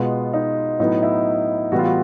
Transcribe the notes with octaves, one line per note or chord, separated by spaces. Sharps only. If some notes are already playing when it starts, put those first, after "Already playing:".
Already playing: B2 G#3 B3 F4
D#4
A2 F#3 B3 D#4
E4
A2 E3 G3 B3 F#4
F4
F#4